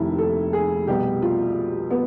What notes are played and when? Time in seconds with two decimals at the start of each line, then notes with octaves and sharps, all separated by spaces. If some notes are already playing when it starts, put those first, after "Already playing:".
Already playing: F1 D#2 D#3 E4
0.18 A4
0.53 G#4
0.87 C2 B2 G4
1.22 F4
1.91 B3